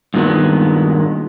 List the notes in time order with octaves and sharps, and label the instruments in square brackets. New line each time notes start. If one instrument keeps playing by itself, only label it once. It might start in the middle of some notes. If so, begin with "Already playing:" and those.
[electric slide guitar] G2 A#2 D#3 G#3 B3